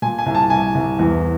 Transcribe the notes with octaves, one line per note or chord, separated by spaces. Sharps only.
A#2 G#5
G#5
C2
A5
C2 G#5
C2
E2